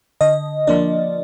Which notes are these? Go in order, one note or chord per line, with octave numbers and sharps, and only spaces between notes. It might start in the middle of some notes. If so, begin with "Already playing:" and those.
D3 D#5
F3 A#3 D4 D5